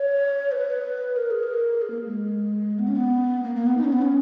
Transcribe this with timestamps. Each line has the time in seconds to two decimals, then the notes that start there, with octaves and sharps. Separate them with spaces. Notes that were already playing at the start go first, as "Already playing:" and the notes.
Already playing: C#5
0.52 B4
1.16 A#4
1.31 G#4
1.43 A#4
1.82 G#4
1.90 A#3
2.06 G#3
2.79 B3
2.88 C#4
2.96 B3
3.44 A#3
3.56 A#3
3.67 B3
3.77 D#4
3.84 C#4
3.93 B3
4.02 C#4